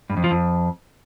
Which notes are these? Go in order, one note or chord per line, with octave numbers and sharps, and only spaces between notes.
G2
F2
F3
F2